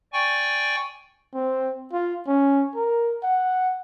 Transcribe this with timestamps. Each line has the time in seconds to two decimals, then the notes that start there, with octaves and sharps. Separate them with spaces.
0.13 D5 G5 G#5 C#6
1.34 C4
1.93 F4
2.27 C#4
2.75 A#4
3.23 F#5